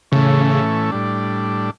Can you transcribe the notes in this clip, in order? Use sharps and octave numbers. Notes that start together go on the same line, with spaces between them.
A2 C#3 E3 A3 C#4
A2 G3 D4